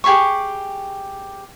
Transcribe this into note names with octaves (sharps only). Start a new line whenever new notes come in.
G4 G#4 B5 C#6